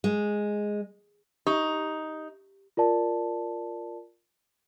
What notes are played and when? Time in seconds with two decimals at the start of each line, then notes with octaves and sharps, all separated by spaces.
0.04 G#3
1.47 D#4 G4
2.77 F4 A#4 D5 A5